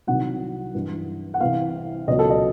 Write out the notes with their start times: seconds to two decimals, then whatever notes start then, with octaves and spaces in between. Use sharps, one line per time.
0.07 C2 C3 D#3 F#3 F#5
0.74 G2 E3
1.34 F#5
1.40 C2 C3 E3 F5
2.07 C#2 B2 F#3 D#5
2.19 A4
2.30 D#5